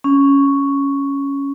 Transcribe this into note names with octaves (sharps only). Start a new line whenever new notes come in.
C#4